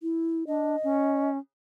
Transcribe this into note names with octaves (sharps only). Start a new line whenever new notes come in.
E4
D4 D#5
C#4